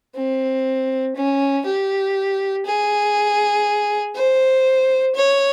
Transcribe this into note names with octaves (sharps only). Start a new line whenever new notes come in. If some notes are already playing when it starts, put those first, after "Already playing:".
C4
C#4
G4
G#4
C5
C#5